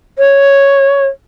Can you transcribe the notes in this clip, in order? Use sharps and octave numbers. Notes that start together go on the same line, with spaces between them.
C#5